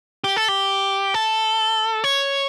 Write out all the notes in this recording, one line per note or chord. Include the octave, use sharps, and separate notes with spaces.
G4
A4
G4
A4
C#5